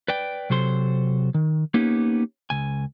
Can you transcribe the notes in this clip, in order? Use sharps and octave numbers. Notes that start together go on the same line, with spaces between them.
B4 D5 G5
C3 F#3 A4 C5 C6
D#3
A#3 B3 C#4 D#4 G4
C#2 G#5